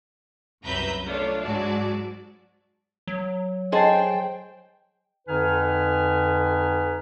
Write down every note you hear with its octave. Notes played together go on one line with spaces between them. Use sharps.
C2 F#2 B4 E5 A#5 G6
A3 D4 F4 C#5
G#2 F#3 F#4 D5 A5
F#3
G#4 C5 D#5 G5 A5 A6
F2 D3 D#4 B4 G#5 F6